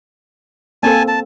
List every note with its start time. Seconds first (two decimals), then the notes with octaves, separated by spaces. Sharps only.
0.83 A#3 C4 A4 G#5 A5
1.08 A5